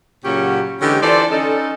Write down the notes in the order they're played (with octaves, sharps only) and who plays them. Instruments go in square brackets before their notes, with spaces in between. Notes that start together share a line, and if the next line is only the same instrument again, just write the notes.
[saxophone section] A#2 C#3 F#3 C#4 F#4 G4
D3 E3 G#3 C#4 G4
E3 F4 A4 C5 D5
C#4 D#4 A4